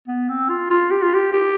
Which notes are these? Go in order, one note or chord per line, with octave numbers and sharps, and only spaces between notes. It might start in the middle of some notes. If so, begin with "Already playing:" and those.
B3
C4
F4
F4
G4
F4
G4
G4